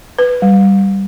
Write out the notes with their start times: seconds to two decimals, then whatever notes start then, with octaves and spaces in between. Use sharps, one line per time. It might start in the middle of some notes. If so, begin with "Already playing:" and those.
0.19 B4
0.42 G3